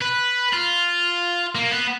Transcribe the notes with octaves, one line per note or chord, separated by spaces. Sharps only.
B4
F4
A#3
B3